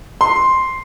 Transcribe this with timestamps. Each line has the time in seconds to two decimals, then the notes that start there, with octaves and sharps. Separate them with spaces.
0.21 C6